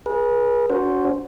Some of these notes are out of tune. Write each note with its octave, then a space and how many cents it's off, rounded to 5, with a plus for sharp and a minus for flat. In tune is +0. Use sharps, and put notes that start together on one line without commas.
G#4 +0 B4 -40
C#4 +45 F#4 +0 C5 +0